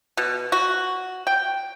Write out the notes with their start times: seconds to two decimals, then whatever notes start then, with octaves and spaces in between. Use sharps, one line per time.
0.17 B2
0.52 F#4
1.27 G5